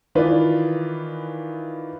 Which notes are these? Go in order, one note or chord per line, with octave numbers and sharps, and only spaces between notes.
D#3 E3 F4 B4 D5